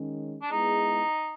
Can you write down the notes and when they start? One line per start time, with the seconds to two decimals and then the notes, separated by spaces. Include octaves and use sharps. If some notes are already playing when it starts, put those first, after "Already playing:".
Already playing: D#3 G#3 C#4
0.42 D4
0.50 G#3 B3 D#4 E4 G#4